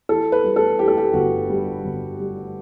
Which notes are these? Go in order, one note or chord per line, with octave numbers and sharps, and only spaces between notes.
E3 A4
B4
G3
A4
E3 G4
A4
G4
G1 F#4
G3
G1
G3